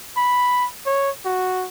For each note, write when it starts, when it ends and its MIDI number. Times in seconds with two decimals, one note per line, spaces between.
0.17 0.66 83
0.86 1.10 73
1.25 1.66 66